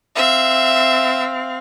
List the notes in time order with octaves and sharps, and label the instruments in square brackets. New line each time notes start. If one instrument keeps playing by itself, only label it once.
[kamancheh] C4 F5 [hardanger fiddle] E5